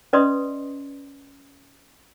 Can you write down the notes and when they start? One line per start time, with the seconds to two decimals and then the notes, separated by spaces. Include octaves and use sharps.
0.13 C#4 B4 D5 D#5 C6 D#6